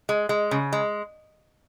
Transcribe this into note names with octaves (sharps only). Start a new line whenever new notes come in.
G#3
G#3
C#3
G#3